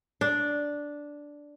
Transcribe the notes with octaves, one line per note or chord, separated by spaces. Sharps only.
D4